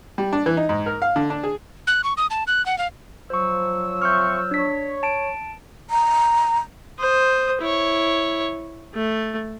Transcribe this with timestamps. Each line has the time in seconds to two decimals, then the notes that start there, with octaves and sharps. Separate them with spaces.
0.18 G3
0.33 D4
0.46 E3
0.57 D#4
0.69 G#2
0.86 A#4
1.02 F5
1.16 D3
1.30 D4
1.43 G#4
1.87 F#6
2.04 C#6
2.17 D#6
2.30 A5
2.47 F#6
2.66 F#5
2.78 F5
3.30 F3 F#3 C5 C#6 E6
4.02 C4 E5 C#6 F6 G6
4.51 D4 C#5 B6
5.03 A5 D7
5.90 A#5
6.99 C5 D#6
7.61 E4 C#5
8.94 A3